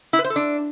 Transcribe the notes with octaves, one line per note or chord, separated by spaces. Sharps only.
E4
B4
C5
A4
D4